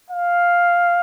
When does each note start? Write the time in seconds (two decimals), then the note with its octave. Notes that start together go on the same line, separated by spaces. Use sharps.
0.10 F5